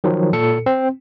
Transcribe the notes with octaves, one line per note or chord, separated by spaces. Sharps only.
D#3 F3 F#3
A#2 A4 C#7
C4